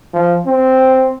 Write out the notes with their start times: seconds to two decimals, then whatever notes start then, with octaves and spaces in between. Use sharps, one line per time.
0.13 F3
0.46 C4